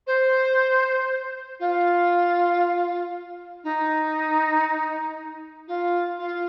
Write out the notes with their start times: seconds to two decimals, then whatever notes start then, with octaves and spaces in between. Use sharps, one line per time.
0.07 C5
1.60 F4
3.64 D#4
5.68 F4
6.19 F4